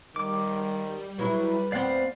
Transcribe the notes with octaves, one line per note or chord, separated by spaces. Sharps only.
D#3 G3 D6
F#3 E4 B4
E2 B3 C4 D5 F5